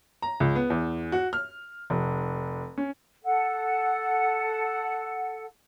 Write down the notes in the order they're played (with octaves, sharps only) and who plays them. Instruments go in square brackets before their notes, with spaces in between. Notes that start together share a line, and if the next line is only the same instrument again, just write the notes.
[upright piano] A#5
C#2
B3
E2
F#4
F6
F1
C#4
[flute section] A4 F#5